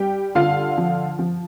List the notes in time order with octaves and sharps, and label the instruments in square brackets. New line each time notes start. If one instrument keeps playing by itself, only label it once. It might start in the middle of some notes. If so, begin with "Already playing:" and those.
Already playing: [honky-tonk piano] G3 G4 G5
D3 F4 F5
F3
F3